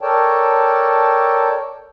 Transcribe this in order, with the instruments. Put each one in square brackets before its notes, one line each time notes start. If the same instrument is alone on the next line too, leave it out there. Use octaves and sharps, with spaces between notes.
[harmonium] A4 A#4 C#5 D5 G5 A5